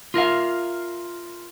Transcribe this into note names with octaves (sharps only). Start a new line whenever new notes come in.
F4 A#4 E5 F5